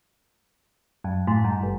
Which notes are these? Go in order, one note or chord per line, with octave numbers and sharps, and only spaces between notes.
F#2
A2
G2
G#1